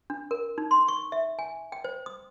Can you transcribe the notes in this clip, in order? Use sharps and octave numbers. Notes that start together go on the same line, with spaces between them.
D4
A#4
D#4
C6
C#6
E5
G#5
G5
C5
D#6